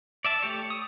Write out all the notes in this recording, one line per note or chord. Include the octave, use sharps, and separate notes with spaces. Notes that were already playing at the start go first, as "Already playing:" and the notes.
D5 E5 A5
A3 G4 C#5
D#6